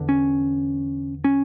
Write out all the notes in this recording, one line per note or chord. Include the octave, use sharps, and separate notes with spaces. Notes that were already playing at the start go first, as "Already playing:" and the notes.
Already playing: E2 D3
C#4
C#4